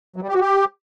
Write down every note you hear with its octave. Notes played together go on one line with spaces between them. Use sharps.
F#3
G3
G4
F#4
G4